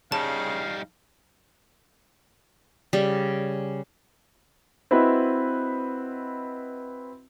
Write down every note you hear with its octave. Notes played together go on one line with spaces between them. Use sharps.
C#3 G3 D#4 F5 A5
C#3 G3
C4 E4 F#4 B4 D#5